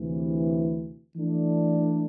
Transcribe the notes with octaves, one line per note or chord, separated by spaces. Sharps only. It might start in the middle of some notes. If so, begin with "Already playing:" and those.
Already playing: D2 C3 E3
E3 A3 D4